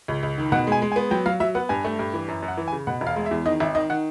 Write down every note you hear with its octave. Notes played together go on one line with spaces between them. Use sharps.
C#2
C#2
D#3
B2 F#5
G#3 G#5
G#3
G#5
B3
F#3 G5
F#3 F5
F#3 E5
B3 F#5
G2 G#5
A3
G2
E3
F#2
F#2
F#5
E3
G#5
C#3
B2 F#5
E1
F5
G#3
E5
E2
D#3 D#5
G#1 E5
D#3 D#5
D#3 F#5